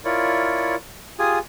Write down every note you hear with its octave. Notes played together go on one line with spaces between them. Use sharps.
E4 F4 A#4 C#5 D5
F4 G4 G#4 G#5 D#6